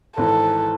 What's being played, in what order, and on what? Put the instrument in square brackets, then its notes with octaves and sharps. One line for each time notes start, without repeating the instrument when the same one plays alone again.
[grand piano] G#1 G#2 E3 [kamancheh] A4